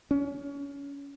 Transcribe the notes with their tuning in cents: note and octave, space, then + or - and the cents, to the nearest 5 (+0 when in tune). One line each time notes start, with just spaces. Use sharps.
C#4 +25